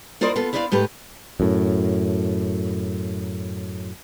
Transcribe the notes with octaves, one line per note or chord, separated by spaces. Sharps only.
E4 F4 A#4 C5 D5 D#5
B3 F4 A4
E4 B4 C5 D5 D#5 F5
G#2 A3 G4 B4
F#2 A2